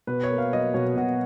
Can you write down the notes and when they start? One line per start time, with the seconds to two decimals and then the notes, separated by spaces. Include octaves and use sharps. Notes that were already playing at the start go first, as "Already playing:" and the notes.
0.07 B2 B4
0.23 C#5
0.31 A#3
0.38 F5
0.53 F#3 D#5
0.74 B2 C#5
0.96 B2 F#4